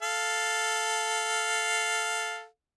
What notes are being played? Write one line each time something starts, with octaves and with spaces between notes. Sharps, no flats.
A4 F5